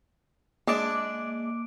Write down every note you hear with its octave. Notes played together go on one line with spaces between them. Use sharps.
G#3 A#3 D4 D6 D7